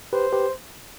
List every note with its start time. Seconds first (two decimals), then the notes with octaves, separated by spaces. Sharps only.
0.13 G4 B4 C5
0.33 G4 B4